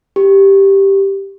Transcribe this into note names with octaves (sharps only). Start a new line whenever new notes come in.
G4